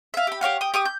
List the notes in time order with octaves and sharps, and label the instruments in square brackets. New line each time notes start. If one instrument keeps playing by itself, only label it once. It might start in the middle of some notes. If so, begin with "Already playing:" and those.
[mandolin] E5 F5
G4 B5
G4 C#5 F5 F#5
G5 D#6
G4 C#6 D#6
G6